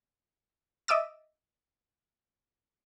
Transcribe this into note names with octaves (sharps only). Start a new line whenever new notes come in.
D#5 E5 D6 E6 A6